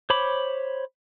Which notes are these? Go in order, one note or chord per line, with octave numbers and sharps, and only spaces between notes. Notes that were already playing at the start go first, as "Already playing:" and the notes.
C5 C#5 B5 D6